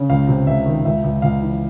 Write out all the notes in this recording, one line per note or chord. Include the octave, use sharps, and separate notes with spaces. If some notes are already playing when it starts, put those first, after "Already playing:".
Already playing: C#3
C#2 F5
C3
C#2 E5
D#3
C#2 E5
C#2
C#2 F5
E3